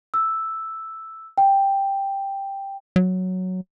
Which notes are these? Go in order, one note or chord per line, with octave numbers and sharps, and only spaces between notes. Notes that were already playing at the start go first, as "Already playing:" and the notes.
E6
G5
F#3